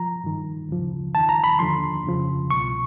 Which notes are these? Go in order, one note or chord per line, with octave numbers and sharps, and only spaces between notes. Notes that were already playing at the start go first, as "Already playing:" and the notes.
Already playing: F3 A#5
G2 D#3
D2 C#3 F3
D#2 D#3 A5
A#5
B5
D#2 D3 F3 C6
F2 C#3 F3
C2 B2 C#6